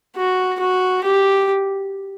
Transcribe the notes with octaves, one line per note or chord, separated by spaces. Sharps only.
F#4
F#4
G4